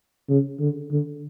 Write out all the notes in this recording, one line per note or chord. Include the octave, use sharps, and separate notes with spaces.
C#3
D3
D3